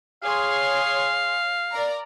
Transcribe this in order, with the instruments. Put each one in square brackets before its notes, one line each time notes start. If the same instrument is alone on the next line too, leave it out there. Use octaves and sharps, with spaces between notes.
[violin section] G#4 C#5 C6 [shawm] F5
[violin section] A#4 D5 A#5